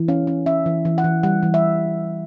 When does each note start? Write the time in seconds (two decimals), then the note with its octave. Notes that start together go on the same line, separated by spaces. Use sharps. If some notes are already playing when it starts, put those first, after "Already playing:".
Already playing: E3
0.08 C#4 F5
0.27 C#4
0.46 C#4 E5
0.66 E3
0.85 E3
0.98 F#5
1.04 E3
1.23 G3 F#5
1.43 E3
1.54 E5